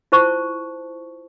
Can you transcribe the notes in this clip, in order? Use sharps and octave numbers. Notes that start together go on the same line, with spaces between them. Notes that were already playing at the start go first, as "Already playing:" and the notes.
E4 F4 C5 A5 C#6